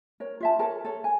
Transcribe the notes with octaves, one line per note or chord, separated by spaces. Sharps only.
A#4 C#5
F4 E5 A5
A4 A#4 C#5 A5
A4 C#5
G#5